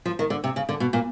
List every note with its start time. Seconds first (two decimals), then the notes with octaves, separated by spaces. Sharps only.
0.05 F3
0.19 D#3
0.30 D3
0.44 C3
0.56 C#3
0.69 D3
0.80 B2
0.93 A#2